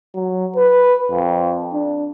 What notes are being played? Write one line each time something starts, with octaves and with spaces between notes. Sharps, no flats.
F#3
B4
F2
D4